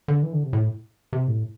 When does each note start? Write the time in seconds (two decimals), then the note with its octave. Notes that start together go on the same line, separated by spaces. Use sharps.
0.08 D3
0.23 E3
0.33 D3
0.43 C3
0.53 A2
1.13 C3
1.28 A2